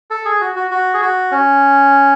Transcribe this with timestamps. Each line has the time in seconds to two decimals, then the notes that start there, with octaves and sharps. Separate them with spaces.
0.11 A4
0.25 G#4
0.41 F#4
0.56 F#4
0.71 F#4
0.94 G#4
1.01 F#4
1.32 C#4